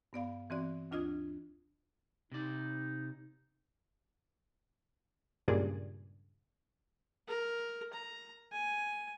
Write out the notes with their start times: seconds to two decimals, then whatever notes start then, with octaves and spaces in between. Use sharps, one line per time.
0.13 G2 B3 D5 F5
0.50 E3 C4 F#4 D5
0.91 D2 D4 F4 D#5 D#6 G#6
2.32 C3 D#4 D5
5.48 C#2 G2 A#2 G#4 D5
7.28 A#4
7.93 A#5
8.52 G#5